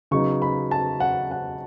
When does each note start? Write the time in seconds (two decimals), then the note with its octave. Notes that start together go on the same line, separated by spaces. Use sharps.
0.11 C#3 F#3 B3 D#4 C#6
0.42 B5
0.71 A5
1.00 F#5
1.31 F#5